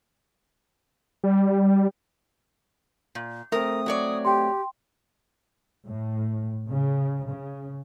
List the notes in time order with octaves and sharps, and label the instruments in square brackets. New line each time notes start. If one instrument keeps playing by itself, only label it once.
[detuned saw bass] G3
[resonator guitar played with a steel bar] A#2
[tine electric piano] A3 C4 [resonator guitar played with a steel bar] A#4 [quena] D#6
[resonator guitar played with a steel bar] F#3 C#5 D5
[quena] G4 [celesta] G5 C6
[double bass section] A2
C#3
C#3